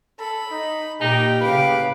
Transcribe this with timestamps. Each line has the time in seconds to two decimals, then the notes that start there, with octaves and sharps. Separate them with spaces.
0.20 A4 B5
0.51 D#4
1.01 A#2 D#4 G4 A#4 G5
1.41 A2 C#3 B4 F5 D7